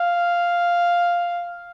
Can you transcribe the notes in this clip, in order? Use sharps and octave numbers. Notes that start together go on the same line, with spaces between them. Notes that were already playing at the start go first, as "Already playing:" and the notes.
Already playing: F5